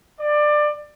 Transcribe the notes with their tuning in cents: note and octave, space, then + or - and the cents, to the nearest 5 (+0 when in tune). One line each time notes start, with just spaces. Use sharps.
D5 +20